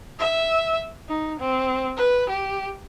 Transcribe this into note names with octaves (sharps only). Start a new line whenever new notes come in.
E5
D#4
C4
B4
G4